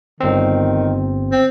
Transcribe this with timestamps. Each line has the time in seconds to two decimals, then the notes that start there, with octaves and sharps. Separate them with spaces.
0.21 G1 D#3 C4
1.32 C4